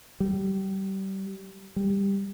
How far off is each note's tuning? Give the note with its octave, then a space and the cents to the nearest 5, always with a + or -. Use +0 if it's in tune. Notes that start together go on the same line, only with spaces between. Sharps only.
G3 -25
G3 +15